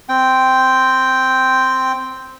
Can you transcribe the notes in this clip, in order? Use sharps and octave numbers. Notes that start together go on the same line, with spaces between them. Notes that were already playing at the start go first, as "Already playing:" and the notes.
C4 G5